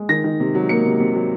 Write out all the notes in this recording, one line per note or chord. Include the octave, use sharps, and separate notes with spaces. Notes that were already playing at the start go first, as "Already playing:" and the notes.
Already playing: G#3
D#3 A#6
D#3
C3
F#3
A#3 C#7
C3
C3
F#3